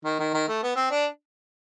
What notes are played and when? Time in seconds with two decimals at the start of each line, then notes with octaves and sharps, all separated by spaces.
0.05 D#3
0.19 D#3
0.34 D#3
0.48 A3
0.63 B3
0.76 C4
0.91 D4